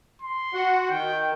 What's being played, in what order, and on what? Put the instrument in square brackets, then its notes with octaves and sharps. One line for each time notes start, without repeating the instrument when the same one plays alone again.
[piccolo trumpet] C6
[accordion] F#4 F#5
[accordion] D#3 [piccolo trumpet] G5